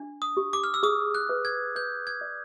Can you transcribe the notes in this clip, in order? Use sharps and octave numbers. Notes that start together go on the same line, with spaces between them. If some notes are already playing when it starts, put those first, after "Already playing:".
Already playing: D4
D#6
G4
D6
F6
E6
G#4 D#6
F#6
B4
G#6
B4 G6
G#6
D5